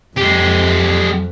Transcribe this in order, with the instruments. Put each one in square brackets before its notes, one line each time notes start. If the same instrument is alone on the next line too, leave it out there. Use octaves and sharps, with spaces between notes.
[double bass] F2 [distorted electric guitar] G#3 G4